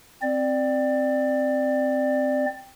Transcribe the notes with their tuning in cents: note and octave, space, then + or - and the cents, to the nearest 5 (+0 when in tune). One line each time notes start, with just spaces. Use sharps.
C4 +0 D5 +15